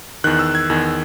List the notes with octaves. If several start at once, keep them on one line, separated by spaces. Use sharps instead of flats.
E2 D#3 F#6
E6
G#6
E2 D#3